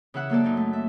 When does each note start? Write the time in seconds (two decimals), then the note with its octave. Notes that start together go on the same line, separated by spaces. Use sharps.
0.14 C#3 E3 E5 F#5 F#6
0.29 F#3 A#3 A4 D5
0.44 F#2 D#4
0.57 A3
0.73 E5